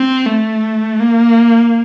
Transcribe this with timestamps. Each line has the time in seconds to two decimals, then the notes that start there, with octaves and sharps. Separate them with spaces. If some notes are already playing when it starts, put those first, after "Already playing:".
Already playing: C4
0.25 A3
1.00 A#3